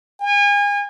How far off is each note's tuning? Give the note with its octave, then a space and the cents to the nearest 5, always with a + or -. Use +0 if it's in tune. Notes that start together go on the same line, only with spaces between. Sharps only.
G#5 -35